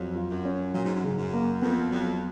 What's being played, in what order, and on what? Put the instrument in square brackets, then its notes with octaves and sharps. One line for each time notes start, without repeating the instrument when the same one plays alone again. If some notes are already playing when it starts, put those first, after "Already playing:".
Already playing: [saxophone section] F2 [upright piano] F#3
[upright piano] F4
[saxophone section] F#2
[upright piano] C#4
[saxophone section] A#2 [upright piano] F#3
[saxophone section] G#2
F#2
[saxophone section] G#2 [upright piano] C#3
[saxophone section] F#2
[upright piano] A#3
[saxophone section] F2 [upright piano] B3
[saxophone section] F2 [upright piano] F#3